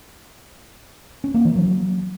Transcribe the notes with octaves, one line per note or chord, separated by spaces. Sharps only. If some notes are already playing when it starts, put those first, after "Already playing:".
C#4
A#3
E3
F#3